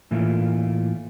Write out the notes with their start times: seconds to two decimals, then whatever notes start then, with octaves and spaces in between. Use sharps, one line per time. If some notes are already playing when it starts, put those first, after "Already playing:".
0.11 A2 E3 A3 A#3 F4